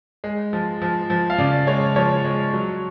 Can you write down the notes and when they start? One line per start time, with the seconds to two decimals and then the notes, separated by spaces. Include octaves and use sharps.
0.24 G#3
0.53 F3
0.82 F3
1.10 F3
1.30 F5
1.38 C#3 D5
1.67 G#3 C#5
1.96 F3 C#5
2.24 G#3
2.54 F#3